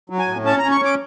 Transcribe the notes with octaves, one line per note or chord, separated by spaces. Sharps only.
F#3
G#5
A2
C#4 A5
A#5
C#4
C#6
C#4 D6